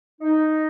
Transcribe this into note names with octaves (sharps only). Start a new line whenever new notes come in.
D#4